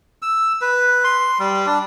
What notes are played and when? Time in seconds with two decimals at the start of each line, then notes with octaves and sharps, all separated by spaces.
0.22 E6
0.61 B4
1.04 C6
1.39 G3
1.66 D4